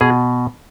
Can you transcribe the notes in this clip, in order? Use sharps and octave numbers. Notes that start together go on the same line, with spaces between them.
B2 G#4